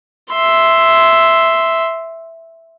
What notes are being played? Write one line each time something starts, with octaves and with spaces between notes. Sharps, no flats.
E5 C6